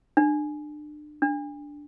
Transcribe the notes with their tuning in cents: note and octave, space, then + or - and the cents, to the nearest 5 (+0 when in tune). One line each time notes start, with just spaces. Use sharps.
D4 +35
D4 -5